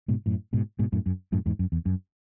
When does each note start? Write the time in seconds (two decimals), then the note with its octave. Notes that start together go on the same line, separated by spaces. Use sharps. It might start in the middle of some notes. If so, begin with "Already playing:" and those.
0.08 G#2 B2
0.26 F#2 A2
0.53 G#2 B2
0.79 G#2 B2
0.93 F#2 A2
1.06 F#2
1.33 F#2 A2
1.46 E2 G#2
1.59 F#2
1.72 E2
1.86 F#2